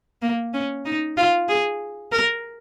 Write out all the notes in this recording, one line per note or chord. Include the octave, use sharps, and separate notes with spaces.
A#3
C#4
D#4
F4
G#4
A#4